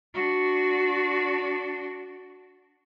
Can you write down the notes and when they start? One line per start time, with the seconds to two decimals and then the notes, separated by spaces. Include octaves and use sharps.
0.14 D4 F#4